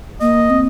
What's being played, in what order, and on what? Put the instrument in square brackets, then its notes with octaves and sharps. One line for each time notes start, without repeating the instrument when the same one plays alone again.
[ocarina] A#3 [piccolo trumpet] D#5
[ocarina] C4